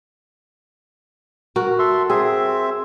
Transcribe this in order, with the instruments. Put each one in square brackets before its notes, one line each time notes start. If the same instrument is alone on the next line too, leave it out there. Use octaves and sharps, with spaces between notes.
[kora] F#4 A#4
[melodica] A4 E5 C6
[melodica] C4 E5 [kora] G#4